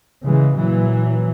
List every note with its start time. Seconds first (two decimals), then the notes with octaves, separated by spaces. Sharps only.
0.22 C#3 E3 G#3
0.57 A#2 E3 F#3